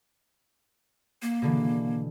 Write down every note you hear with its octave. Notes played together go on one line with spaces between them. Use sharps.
A#3
B2 D3 E3